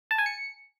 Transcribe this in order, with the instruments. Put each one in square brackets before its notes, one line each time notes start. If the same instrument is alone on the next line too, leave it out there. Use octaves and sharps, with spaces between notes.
[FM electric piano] A5
G#5
C#7